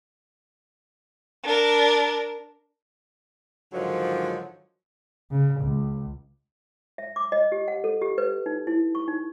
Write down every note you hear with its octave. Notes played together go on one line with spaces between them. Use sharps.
D4 A#4
G#2 D3 D#3 F3 F#3
C#3
C#2
E5
D6
D#5
G4
F#5
A4
G4
B4
D#4
E4
C#6
D#4